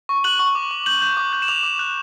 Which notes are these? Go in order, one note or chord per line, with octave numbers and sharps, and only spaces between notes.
C#6
F#6 F#7
C#6
D6
D6
G6 F#7
G6
D6
G6
E7
D6 F7
D6
F#6